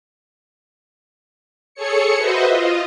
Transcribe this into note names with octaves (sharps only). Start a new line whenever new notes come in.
G#4 A4 C#5 C#7
F#4 B4 C5 D#5 E5
F4 D#5